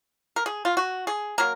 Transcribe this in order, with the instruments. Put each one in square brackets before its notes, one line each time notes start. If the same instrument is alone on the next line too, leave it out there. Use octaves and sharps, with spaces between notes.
[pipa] A#4
G#4
F4
F#4
G#4
F#3 A#3 A#4